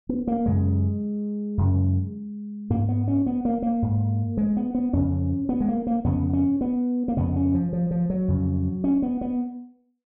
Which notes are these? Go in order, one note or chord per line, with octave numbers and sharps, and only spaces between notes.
B3
A#3
F#2 C#3 G#3
F#2 C#3
G#2 A#3
B3
C#4
B3
A#3
A#3
G#2
G#3
B3
B3
F2 C#3 C#4
B3
G#3
A#3
A#3
F2 C#3 B3
C#4
B3
A#3
F2 C#3 B3
C#4
F3
F3
F3
F#3
F2 C#3
C#4
B3
B3